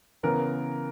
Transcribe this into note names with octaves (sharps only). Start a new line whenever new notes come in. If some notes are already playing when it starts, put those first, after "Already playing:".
C#3 E3 B3 A#4